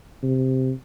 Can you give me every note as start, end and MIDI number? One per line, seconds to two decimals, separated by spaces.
0.23 0.72 48